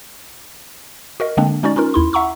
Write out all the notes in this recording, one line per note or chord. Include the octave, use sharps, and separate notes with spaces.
F#4 A#4 D#5
D3 G#3 A#3 C4 D4
G#3 C#4 D#4 F#4 D5
C#4 D#4 F4 A#4
D#2 E4 C6
E5 F#5 A#5 C#6 E6